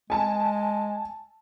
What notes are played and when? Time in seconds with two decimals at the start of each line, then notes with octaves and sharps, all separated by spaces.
0.10 G#3 G#5 A5